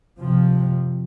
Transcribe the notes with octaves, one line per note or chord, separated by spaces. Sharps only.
F2 C3 F3